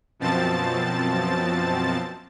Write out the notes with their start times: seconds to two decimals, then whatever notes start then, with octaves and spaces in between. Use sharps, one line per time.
0.19 F#2 B2 F3 C4 A5 A6